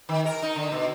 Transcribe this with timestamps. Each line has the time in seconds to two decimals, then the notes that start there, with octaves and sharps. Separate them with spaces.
0.09 D#3
0.25 A#4
0.42 D#4
0.56 D3
0.72 B2